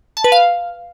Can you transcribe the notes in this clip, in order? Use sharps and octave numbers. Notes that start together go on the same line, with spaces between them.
A5
B4
F5